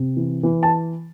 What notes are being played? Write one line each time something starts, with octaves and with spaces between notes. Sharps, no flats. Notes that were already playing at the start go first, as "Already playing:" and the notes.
Already playing: C3
E3
E3
A5